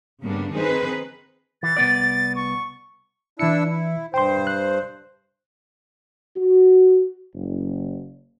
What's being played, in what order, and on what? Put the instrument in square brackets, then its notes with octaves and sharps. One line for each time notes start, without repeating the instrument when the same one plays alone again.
[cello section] G2 C#3 G3 A#3 B3 D4
D#3 C4 D#4 G#4 B4 C5
[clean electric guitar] E3 [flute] A6
[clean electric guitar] C2 B3 D5
[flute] C#6
[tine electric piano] E3 C#7 [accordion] D4 E4 E6
[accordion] E4
[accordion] G2 C5 [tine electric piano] G5 C6
[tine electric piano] F#6
[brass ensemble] F#4
F#1